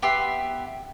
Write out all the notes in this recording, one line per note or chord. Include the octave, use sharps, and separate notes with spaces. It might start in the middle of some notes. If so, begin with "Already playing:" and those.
B3 G4 E5 C6